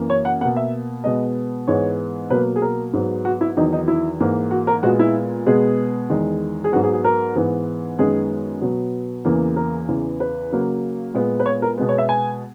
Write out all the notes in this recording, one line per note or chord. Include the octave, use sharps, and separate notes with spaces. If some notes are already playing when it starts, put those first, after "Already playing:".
Already playing: F#2 E3 A#3
C#5
F#5
B2 A#3 F#5
E5
B2 G#3 B3 D#5
G#2 E3 G#3 B3 C#5
B2 F#3 A#3 B4
G#4
A#4
G#2 F#3 B3
F#4
E4
E2 D#3 F#3 D#4
D#4
E4
G#2 E3 A#3
F#4
A#4
A#2 G#3 B3 F#4
E4
B2 G#3 B3 G#4
E2 D#3 G#3
G#4
G#2 F#3 B3 F#4
G#4
G#4
A#4
G#2 E3 B3
F#2 D#3 G#3 B3 G#4
B2 F#3 B3
E2 C#3 E3 A#3
A#4
E2 C#3 E3
B4
C#3 F#3 A#3
A#2 G#3 B3
B4
C#5
A#4
B2 G#3 B3
C#5
E5
G#5